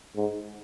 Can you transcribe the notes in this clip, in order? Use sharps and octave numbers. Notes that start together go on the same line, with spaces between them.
G#2